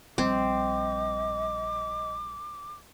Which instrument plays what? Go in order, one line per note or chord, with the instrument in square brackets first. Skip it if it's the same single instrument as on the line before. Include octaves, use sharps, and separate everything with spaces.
[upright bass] A#1 G3 [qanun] C4 [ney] D#5 [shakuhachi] D6